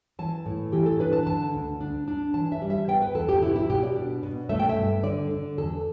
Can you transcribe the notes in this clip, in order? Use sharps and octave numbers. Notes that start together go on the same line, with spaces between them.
E3 A5
A2
E3 G4
A4
D4 B4
A5
D3 A5
D2
D4
D4
E3 A5
E5
G3
E5
B3 G5
B4
E2 A4
G4
B2 E4
E4
B2 G4
D5
D4
B2
A3 E5
G5
E5
G2
D3 D5
D3
E2 A4